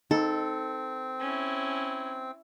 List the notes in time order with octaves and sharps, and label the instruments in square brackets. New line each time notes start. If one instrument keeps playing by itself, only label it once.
[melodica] C4 [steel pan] D#4 [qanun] A4
[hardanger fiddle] C#4 E4